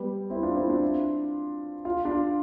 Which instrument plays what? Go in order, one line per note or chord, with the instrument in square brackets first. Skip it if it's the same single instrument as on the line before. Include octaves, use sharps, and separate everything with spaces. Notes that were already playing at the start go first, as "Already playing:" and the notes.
Already playing: [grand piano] G3 B3
C4 E4
D4 F4
C4 E4
D4 F4
F4
D4 F4